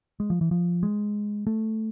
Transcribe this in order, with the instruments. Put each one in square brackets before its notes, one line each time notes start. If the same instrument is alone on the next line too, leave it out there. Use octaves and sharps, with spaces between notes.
[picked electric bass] G#3
F3
E3
F3
G#3
A3